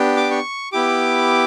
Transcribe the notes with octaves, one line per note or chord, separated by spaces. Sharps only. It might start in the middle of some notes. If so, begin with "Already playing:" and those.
Already playing: B3 D4 G4
D6
C#6
B3 E4 G4 D6